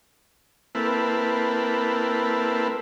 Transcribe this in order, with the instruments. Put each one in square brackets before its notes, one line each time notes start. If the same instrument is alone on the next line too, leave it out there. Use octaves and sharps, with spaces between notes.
[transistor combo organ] A#3 C4 E4 A4 B4